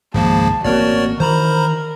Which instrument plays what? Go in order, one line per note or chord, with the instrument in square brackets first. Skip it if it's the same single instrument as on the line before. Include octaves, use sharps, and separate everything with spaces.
[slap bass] G#1 C#2 G#2 [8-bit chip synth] C#3 F3 A#3 [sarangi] A5
[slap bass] A1 A#3 C4 [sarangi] F#4 [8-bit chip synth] A#4 C#5 D5
[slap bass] D#3 E3 [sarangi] A#4 [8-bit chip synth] C5 A#5 B5